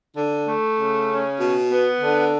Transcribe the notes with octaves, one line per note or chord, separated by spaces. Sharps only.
D3
A3
C#3
C#4
B2
B3
D3